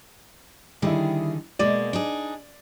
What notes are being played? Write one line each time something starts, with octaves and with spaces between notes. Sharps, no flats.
D3 D#3 G3 E4 G#4
B2 G#3 A#3 D5
D4 D#4 G#4